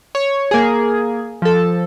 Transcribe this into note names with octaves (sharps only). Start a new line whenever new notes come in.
C#5
A#3 G#4
F3 A4